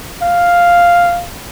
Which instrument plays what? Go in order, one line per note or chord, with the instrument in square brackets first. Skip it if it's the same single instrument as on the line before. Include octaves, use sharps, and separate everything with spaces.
[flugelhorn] F5